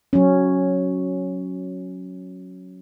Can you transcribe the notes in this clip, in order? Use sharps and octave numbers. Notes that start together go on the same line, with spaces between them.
F#3 C#4